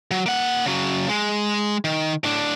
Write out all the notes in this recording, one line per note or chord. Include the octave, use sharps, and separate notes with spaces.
F#3
A#3 F#5
C#3 F#3
G#3
D#3
A2 D4